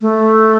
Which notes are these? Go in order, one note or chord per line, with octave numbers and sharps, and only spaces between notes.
A3